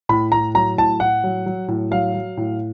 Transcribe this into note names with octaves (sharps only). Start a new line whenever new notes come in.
A2 B5
A2 A#5
F#3 A#5
A2 A5
A2 F#5
F#3
F#3
A2
F#3 F5
F#3
A2